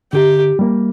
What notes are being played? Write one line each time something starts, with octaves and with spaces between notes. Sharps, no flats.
D3 G4
G3 A#3